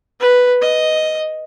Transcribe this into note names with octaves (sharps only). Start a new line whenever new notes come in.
B4
D#5